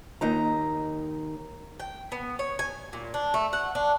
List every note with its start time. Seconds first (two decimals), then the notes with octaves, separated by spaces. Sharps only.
0.21 D#2 D#4 A#5
1.79 G5
2.12 B3
2.39 C#5
2.59 G#5
2.93 A#2
3.14 D4
3.34 A3
3.53 F#5
3.75 D4